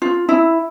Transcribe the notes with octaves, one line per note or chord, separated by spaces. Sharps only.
F4
E4